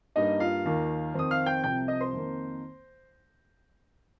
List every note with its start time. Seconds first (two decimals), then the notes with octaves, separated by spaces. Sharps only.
0.16 G2 G3 A#3 D#4 D#5
0.40 F4 F5
0.65 D#2 D#3 A#3
1.14 F2 D#3 C4 D#6
1.31 F5 F6
1.46 G5 G6
1.64 C2 C3 F3 G5 G6
1.88 D#5 D#6
2.01 C5 C6
2.12 F2 D#3 A#3